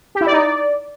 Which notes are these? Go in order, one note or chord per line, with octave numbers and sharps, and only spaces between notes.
G4
E4
D5
D#4
D5